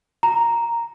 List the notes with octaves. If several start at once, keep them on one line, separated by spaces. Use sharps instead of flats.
A#5